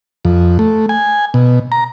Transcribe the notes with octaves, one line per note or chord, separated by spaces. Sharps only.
F2
A3
G#5
B2
A#5